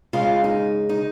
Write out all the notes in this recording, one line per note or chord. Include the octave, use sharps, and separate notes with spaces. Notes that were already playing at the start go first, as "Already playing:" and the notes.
C#3 G#3 C#4 F4
D#4
D#4